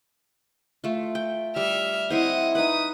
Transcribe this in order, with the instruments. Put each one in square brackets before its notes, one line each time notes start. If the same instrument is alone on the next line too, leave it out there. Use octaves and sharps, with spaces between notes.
[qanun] A3 F4
G5
[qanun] G3 [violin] E5 F6
[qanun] C4 E4 C5 [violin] D#5 F#5
[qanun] D#4 B4 [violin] D#6